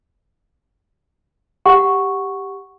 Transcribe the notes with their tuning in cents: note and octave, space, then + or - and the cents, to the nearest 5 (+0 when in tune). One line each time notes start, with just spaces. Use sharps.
G4 +0 F#5 +0 C#6 +0